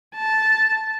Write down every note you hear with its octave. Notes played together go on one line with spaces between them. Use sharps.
A5